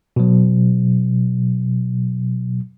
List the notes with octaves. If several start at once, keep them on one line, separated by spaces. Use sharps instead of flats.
B2 F#3